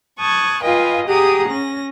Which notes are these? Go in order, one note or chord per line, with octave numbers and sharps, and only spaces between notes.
A5 C#6 D#6 F#6 G#6
F4 B4 D#5 F5 G5 G#5
G4 G#4 F#5 A#5 D#6
C#4 A#6